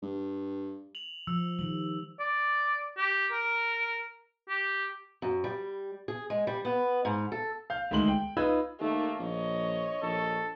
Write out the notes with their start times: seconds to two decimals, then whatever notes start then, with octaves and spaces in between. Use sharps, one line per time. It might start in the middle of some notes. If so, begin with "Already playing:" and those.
0.02 G2
0.95 F7 F#7
1.27 F3 E6
1.59 D#3 G3 F#7
2.19 D5
2.97 G4
3.32 A#4
4.49 G4
5.22 F#2
5.44 G3
6.08 G#4
6.30 G#3
6.47 G3
6.65 B3
7.05 G#2
7.32 A4
7.70 F5 G6
7.91 D2 D#3 G#3 C6 F#7
8.08 G5
8.37 D#4 F4 B4 B5 E6 G#6
8.80 D#2 A3 A#3
9.20 A#1 C#5 D#5
10.02 A#1 A4